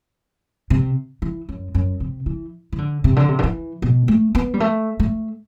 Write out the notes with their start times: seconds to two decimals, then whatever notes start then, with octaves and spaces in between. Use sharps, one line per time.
0.70 C3
1.22 E3
1.49 F#2
1.75 F#2
2.00 C3
2.26 E3
2.72 E3
2.78 D3
3.04 C3
3.16 D3
3.28 C3
3.39 D3
3.44 E3
3.82 B2
4.08 A3
4.35 B3
4.54 G3
4.60 A3
5.00 A3